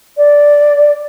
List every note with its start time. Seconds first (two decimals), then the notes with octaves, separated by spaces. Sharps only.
0.17 D5